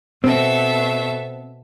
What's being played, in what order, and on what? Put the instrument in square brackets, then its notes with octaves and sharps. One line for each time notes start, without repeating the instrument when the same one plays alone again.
[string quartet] B2 A4 E5 [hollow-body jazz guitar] C4